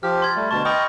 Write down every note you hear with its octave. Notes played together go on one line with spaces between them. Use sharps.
F3 G4 F6
C6 G#6 A6
G3 A3
D2 B2 A5 C#6
D#5 G5 B5 C#6 D#6 F6